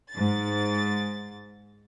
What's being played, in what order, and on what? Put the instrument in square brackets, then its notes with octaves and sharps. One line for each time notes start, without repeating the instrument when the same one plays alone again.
[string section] G#2 A6